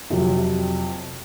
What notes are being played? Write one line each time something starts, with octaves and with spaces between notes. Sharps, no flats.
F2 C3 F#3